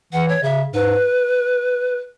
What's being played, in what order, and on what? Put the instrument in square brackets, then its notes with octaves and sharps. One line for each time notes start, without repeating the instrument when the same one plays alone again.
[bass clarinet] E3 [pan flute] F#5
[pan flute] C#5
[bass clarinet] C#3 [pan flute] E5
[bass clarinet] G#2 [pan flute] B4